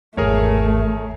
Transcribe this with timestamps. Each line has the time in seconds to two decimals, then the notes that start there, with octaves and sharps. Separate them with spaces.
0.17 G#1 E2 A3 G#4 A#4 C#5